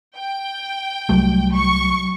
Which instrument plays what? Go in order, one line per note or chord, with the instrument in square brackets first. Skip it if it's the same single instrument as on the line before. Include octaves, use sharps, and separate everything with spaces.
[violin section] G5
[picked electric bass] C2 G3 A3 [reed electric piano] F#3
[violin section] C#6